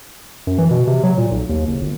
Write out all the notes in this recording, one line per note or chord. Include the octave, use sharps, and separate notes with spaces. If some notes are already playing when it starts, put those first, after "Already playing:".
F#2
E3
B2
C3
F#3
A#2
B1
D#2
F#1
G1